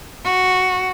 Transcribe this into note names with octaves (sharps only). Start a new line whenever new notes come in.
F#4